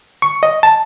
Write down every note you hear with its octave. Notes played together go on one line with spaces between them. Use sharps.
C#6
D#5
A5